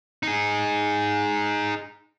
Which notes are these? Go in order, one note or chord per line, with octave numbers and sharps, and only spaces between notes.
D#4 G#4